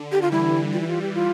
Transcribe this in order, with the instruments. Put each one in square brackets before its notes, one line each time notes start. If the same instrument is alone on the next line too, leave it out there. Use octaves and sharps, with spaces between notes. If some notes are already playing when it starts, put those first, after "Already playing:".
Already playing: [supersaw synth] D3
[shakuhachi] G4
F4
[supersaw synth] E3 G3 [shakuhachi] E4
[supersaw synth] E3 G3 [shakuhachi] F4
[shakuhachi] E4
F4
G4
F4